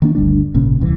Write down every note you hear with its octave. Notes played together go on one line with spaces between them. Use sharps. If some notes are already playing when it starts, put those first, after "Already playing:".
D#3 A#3 D4
G1 D2 G3 D4
G#1 A#2 C#3 C#4
D#1 C2 D3 E3